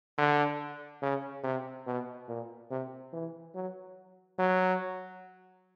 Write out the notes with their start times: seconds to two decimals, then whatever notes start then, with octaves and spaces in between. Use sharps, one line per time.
0.18 D3
1.02 C#3
1.44 C3
1.87 B2
2.28 A#2
2.71 C3
3.13 E3
3.55 F#3
4.39 F#3